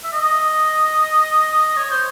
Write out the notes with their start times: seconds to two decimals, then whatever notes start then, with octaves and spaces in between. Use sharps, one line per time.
0.04 E5
0.12 D#5
1.77 C#5
1.91 C5